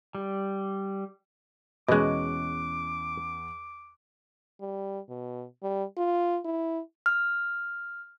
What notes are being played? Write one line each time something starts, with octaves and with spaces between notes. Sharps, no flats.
G3
E2 B2 G#3 C#4 D#5 D6 F#6
G3
B2
G3
F4
E4
F6